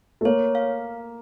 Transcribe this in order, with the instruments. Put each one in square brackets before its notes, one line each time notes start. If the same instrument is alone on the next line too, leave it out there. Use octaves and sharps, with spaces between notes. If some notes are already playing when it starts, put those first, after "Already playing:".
[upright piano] A3
[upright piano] A#3 [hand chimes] C#5
[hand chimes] F5